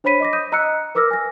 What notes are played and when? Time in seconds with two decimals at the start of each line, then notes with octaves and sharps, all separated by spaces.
0.04 D4 C5 C#5 B5 B6 D#7
0.20 D#5 D6 A#6
0.33 D#6 G6 D#7
0.52 D#5 A#5 E6 F#6 C#7
0.95 A#4 B4 D6 E6 F6 A#6
1.11 G#5 A#6